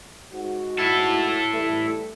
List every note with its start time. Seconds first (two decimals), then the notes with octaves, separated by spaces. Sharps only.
0.33 G#2 F#4
0.79 E4 A4
1.52 E3 G3 A3